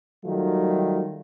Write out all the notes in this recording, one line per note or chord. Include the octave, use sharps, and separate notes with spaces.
D#3 F#3 G3 A3 F4